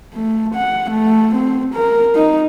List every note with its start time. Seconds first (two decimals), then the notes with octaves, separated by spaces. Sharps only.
0.14 A3
0.55 F#5
0.91 A3
1.35 C4
1.75 A#4
2.15 D#4